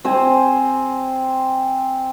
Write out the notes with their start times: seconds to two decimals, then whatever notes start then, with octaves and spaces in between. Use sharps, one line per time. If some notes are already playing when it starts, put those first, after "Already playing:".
0.05 C4 C5 G#5